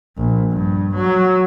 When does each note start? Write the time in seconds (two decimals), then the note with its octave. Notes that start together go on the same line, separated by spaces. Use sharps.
0.17 A#1
0.51 G2
0.95 F#3